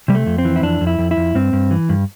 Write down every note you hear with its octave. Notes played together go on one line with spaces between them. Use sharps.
C3 G3
A3
F2
C4
E3
E4
F2 D4
F2
E4
F2
E4
F2
G2 C4
G2
E3
G2